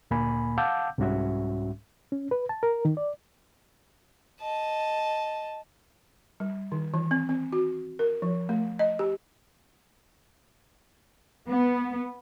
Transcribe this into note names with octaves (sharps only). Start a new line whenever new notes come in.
D2 A#2 A#3 G#5 B5
F5 F#5 A5 D6 E6 G6
C2 G#2 G3 C#4 F#4 E5
C#4
B4
A5
A#4
D#3
D5
D#5 A5
G3
D#3
E3
C4
C4
F#4
A#4
F3
A3
D#5
G4
B3